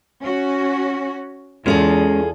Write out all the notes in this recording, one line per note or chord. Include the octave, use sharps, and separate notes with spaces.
C#4 F#4
E2 G#3 C#4 F4 G#4 A4